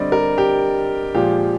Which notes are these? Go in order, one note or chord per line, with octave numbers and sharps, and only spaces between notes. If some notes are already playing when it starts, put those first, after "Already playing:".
Already playing: D3 G3 C4 D5 D#5
A#4
G4
A#2 F3 G#3 G4